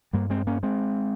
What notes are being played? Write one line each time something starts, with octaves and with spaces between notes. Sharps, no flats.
G2 G3 A#3
G#3 C4
A#3 C#4
G#3 C4